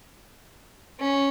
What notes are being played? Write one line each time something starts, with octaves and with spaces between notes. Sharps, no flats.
C#4